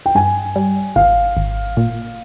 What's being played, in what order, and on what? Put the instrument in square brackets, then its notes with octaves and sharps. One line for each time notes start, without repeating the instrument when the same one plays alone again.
[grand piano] G5
[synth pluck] G2 [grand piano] G#5
[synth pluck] G3
[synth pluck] G#1 [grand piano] F5
[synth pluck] G#1
A#2